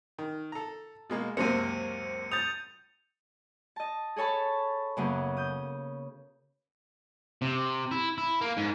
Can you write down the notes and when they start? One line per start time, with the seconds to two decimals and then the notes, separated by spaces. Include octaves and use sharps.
0.18 D#3
0.52 A4 A#5
1.10 B2 G#3 A#3
1.37 C#2 F#2 C3 A#3 C4 C#7 D#7
2.32 D#6 G6 A6 F7
3.76 D#5 A5
4.16 G#4 A4 C#5 A5 B5
4.97 F#2 C#3 F#3 A#3 B3 C#4
5.37 D#6 G6
7.42 C3
7.91 E4
8.18 E4
8.41 A#3
8.57 G#2